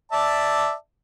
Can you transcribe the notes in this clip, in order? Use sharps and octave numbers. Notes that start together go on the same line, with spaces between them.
D5 E5 A5